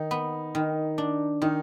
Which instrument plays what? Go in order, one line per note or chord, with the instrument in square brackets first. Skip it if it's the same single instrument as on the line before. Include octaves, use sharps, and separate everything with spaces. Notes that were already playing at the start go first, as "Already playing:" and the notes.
Already playing: [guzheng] D#3 [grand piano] D#4
[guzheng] B3
D#3
D4
[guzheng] D#3 [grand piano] D#4